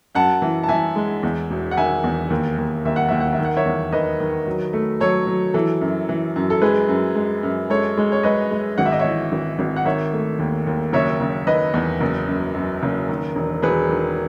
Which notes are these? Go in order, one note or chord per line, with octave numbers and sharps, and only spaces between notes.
F#2 F#5 A5
E3
A5
E3 E5 G#5
G#3
E2
E1
F#5
D#3 E5 G#5
E2
D#2
D#2
D#2 E5
F#5
D#2 E5
F#5
E5
D#3
F#5
C#5 E5
E2
D#3 B4 D#5
D#3
F#3
A3
F#3 A4 C#5
F#3
E3 A4
F#2
E3
F#2
A4
G#3 G#4 B4
F#2
G#3
F#2
G#3 A4 C#5
G#3
C#5
G#3 B4 D#5
G#3
G#1 F#5
E5
D#5
E3 C#5 E5
G#1
G#1
F#5
D#3 C#5 E5
A3
D#2
D#2
F#1 C#5 E5
F#1
D#3 B4 D#5
E2
F#1
F#2
F#2
F#1
D#3
E1
E1 G#4 B4
D#3